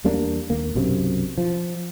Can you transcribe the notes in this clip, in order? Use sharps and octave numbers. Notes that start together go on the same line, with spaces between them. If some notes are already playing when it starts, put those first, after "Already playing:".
E2 G3 A#3 D4
D#2 A#3
B1 F#2 C3
F3